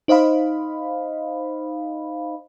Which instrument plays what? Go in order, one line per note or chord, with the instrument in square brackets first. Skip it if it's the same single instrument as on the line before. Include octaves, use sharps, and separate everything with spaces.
[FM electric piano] D#4 C5 D#5 F5 B5